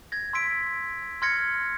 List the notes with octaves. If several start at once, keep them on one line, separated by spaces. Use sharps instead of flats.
G#6 A#6
C6 E6 B6 D7
C6 F6 G#6 A#6 C#7